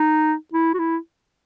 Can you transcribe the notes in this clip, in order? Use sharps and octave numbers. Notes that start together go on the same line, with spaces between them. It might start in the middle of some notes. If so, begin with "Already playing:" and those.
Already playing: D#4
E4
F#4
E4